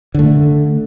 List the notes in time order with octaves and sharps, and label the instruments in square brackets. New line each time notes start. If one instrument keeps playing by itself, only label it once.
[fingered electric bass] D3 A3